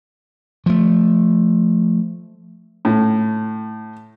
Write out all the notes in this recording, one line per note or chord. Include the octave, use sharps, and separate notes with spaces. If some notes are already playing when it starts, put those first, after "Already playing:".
F3 A3
A2